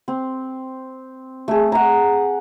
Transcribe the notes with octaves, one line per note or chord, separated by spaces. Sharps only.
C4
A3 G#4
F#5 A#5